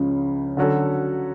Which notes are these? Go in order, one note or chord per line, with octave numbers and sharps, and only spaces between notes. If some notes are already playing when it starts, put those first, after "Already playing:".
Already playing: C#2 C#3 F3 G#3 C#4
D3 F#3 C#4 F#4 A4